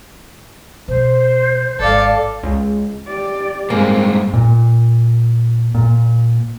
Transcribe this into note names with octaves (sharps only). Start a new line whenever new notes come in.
B2 C5
G#1 A4 D5 F5
C#2
G4 D5
G2 G#3 A#3 C4
A#2
A#2